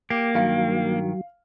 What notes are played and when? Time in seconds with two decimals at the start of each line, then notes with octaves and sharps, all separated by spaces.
0.10 A#3 G4
0.35 G2 D#3 F#3 F5